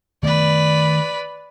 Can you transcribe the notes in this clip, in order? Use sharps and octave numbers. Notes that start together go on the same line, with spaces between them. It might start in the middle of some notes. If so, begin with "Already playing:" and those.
D#3 A3 B3 B4 D5